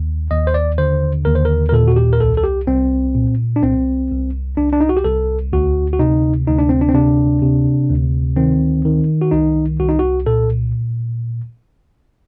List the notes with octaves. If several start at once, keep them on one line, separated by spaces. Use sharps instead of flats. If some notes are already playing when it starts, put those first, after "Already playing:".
Already playing: D#2
D#2 D#5
C5
D5
D3 C5
D#2 A#4
C5
A#4
A#4
A#2 A4
F#4
G4
A#4
C2 A4
A4
G4
C2 C4
A#2
D4
C2 C4
C2
C2 D4
D4
D#4
F#4
G4
C2 A4
D2 F#4
F#4
C3 D#4
D2 D#4
D4
C4
D4
C4
C3 D4
C3
D2
D#3 C4
D#3
F#4
C2 D#4
C2 F#4
D#4
F#4
A#2 A4